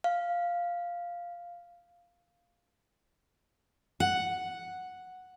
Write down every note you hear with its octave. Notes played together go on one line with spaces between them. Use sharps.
F5
F#5